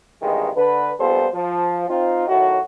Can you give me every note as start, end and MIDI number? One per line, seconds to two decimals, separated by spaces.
0.22 0.49 33
0.22 0.49 40
0.22 0.49 43
0.22 0.49 51
0.22 0.49 56
0.56 0.92 50
0.56 0.92 71
1.00 1.28 34
1.00 1.28 55
1.00 1.28 59
1.00 1.28 65
1.00 1.28 69
1.00 1.28 72
1.34 1.88 53
1.89 2.28 60
1.89 2.28 63
1.89 2.28 65
2.28 2.60 45
2.28 2.60 51
2.28 2.60 54
2.28 2.60 57
2.28 2.60 66